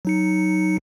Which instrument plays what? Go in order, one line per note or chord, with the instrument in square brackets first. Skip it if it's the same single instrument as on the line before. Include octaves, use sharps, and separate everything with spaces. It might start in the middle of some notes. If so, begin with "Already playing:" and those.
[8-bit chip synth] F#3 D#4 C#7